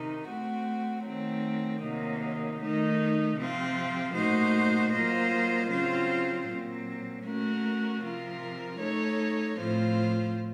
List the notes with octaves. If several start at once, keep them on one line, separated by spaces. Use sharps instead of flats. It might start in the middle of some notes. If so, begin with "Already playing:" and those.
Already playing: C3 D#3 D#4
A3 C4 F#4
D#3 F#3 A3 C4
C3 D#3 F#3 A#3 D#4
D#3 A3 D#4
C3 F3 C4 F4
A#2 A3 D#4 F#4 C5
F#3 A#3 F4 C5 D#5
C#3 F#3 C4 F4 C5
A#2 F#3 C4
A3 C#4 F#4 A#4
C3 F3 C4 F4 A#4
A3 D#4 A4 C#5
A2 F3 C4 F4 C5